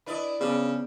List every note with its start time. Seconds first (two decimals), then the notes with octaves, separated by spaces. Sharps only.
0.06 D4 E4 B4 D5 D#5
0.40 C#3 B3 D4 G#4 B4 C5 D5